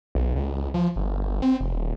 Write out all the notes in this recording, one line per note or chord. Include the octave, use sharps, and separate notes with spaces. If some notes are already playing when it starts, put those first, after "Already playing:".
B1
C#2
F3
G1
C4
F1
D#1